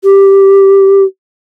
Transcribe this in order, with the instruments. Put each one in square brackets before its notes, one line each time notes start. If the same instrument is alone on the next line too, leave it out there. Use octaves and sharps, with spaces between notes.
[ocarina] G4